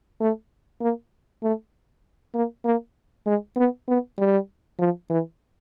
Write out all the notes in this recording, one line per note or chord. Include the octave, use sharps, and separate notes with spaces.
A3
A#3
A3
A#3
A#3
G#3
B3
B3
G3
F3
E3